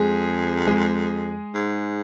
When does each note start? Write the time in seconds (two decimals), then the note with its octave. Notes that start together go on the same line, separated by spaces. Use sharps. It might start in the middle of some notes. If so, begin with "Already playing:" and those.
Already playing: F2 G#3 G#4
0.67 G#3 G#4
1.55 G#2